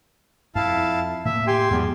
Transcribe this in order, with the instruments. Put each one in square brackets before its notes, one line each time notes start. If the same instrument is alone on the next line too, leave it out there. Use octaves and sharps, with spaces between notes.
[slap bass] F2 [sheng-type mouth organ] E4 F5 A5
[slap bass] A2 A#3 [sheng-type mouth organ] E5
[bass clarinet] G4 [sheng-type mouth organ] G5 G#5 C6
[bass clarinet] E2 [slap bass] G#2 F3 G3